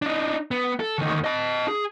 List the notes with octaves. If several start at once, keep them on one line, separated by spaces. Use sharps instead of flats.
D4 D#4
B3
A4
D2 D#3
D#5 A5
G#4